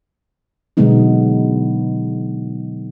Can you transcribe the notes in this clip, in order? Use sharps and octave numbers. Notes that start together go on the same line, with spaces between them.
B2 D3 F#3 G#3 B3 D#4